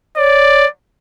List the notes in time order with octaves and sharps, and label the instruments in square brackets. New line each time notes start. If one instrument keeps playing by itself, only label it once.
[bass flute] C#5 [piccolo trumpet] D5